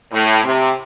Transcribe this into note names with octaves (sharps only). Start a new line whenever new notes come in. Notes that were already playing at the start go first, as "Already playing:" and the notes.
A2
C3